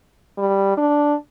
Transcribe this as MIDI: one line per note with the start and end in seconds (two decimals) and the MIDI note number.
0.38 0.74 55
0.77 1.14 62